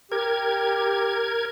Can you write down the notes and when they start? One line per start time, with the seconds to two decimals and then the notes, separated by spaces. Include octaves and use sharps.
0.12 G4 A#4 G#6